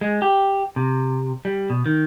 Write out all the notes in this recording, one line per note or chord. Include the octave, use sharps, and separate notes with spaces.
G#3
G4
C3
G3
B2
D#3